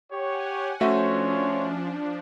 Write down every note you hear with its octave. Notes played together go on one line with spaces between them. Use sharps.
G4 C#5 F#5 G#5
F3 A3 C#4 D4 F#4 C5 C#5 E5